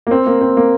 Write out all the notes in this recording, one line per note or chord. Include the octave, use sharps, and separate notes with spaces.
A#3
C4
A#3
C4
A#3